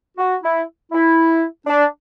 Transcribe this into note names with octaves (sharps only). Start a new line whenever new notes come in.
F#4
E4
E4
D4